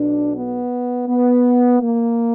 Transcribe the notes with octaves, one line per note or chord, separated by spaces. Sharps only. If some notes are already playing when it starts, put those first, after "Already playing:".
Already playing: B1 B2 D4
B3
B3
A#3